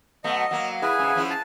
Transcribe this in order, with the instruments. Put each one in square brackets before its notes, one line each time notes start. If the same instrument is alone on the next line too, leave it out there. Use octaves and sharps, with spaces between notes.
[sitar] B2 F#3 A3 [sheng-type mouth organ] D#5
[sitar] F#3 A#3
[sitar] E4 [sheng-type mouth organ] G#4 B4 G#5
[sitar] G#2 C#3
F3 C#4 E4
[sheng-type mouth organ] A5